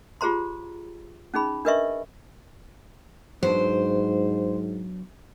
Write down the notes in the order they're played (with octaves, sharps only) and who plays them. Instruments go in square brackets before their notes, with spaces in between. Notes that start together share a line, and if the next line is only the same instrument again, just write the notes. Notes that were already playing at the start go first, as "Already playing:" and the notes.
[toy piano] F4 G4 G#4 C5 A#5 C6
C#4 D#4 G#4 B5
D4 A#4 B4 D#5 E5 C#6
[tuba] G#2 [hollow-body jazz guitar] F#3 B3 D4 [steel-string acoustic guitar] C5